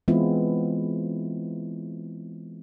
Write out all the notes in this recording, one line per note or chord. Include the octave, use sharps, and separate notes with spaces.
E3 G#3 B3 C4 E4 F4